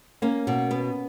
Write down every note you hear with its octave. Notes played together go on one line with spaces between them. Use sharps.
A#3 C#4
B2
B3